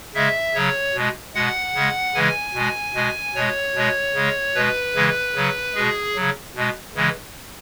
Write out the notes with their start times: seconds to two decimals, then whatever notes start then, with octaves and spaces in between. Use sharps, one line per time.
0.14 C#3 G#3 E5
0.55 C#3 F#3 C#5
0.95 B2 G#3
1.35 B2 G#3 F#5
1.75 C#3 G#3
2.14 C#3 E3 G#3 G#5
2.54 B2 G#3
2.95 B2 G#3
3.35 B2 G#3 C#5
3.75 B2 G#3
4.15 C#3 G#3
4.55 B2 G#3 B4
4.95 C#3 E3 G#3
5.35 C#3 F#3
5.75 B2 G#3 G#4
6.15 C#3 F#3
6.55 B2 G#3
6.95 C#3 E3 G#3